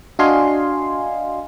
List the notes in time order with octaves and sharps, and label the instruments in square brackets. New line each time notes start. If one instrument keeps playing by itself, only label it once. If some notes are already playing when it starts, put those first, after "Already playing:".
[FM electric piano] D4 F#4 D#5 F5 G#5 C6